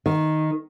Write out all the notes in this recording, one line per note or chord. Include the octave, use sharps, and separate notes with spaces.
D#3